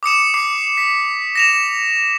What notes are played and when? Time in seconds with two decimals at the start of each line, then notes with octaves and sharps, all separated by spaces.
0.03 D6 D#6 C#7 E7
0.34 D6 C7
0.77 B6
1.35 A#6 E7 F7